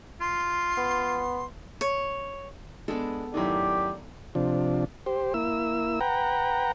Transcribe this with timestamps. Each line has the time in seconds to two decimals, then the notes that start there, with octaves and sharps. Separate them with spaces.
0.21 F4 C6
0.77 B3
1.81 C#5
2.88 G#3 B3 D4 A4
3.34 F#2 A2 D#3 G4 D5
4.35 C3 F3 D4
5.06 G4 C5
5.34 A#3 E4 E6
6.01 B4 F#5 G5 A#5